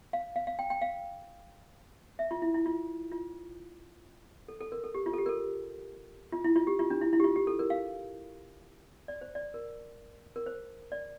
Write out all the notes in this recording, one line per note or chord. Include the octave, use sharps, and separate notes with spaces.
F5
F5
F5
G5
G5
F5
E5
F4
E4
E4
F4
F4
A4
A4
A#4
A4
G4
F4
A4
G4
A#4
A4
F4
E4
F4
G4
F4
D4
E4
E4
G4
F4
G4
A4
A#4
F5
D5
C5
D5
A#4
A#4
C5
D5